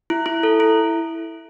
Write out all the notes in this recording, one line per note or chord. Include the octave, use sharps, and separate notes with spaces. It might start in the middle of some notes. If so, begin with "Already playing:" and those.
E4
E4
A4
E4